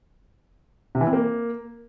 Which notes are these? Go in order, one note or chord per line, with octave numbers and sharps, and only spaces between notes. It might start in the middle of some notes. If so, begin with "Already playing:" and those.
C3
E3
C4
A#3